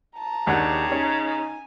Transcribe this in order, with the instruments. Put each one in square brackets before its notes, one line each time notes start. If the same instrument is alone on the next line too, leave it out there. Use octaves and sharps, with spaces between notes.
[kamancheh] A5 A#5
[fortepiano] D#2 D4 F#5 [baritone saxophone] C#3 [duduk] G4
[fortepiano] C#4 [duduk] D#4
[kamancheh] G#5